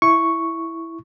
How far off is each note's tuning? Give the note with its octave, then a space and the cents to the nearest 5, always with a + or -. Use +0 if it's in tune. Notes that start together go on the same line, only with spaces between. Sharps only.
E4 +0 C#6 +0